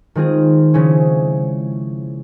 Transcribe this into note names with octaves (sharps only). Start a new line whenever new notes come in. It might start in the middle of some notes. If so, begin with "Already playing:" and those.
D#3 G#3 C4 F4 G#4
C#3 F3 G#3 C#4 E4